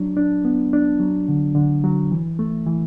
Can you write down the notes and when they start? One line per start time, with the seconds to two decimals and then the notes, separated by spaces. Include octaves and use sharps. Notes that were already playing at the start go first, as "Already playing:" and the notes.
Already playing: F#3 D4
0.17 D4
0.45 B3
0.73 D4
1.00 F#3
1.28 D3
1.55 D3
1.84 F#3
2.12 E3
2.39 A3
2.66 E3